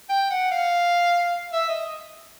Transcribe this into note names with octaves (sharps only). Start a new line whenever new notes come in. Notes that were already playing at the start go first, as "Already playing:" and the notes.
G5
F#5
F5
E5
D#5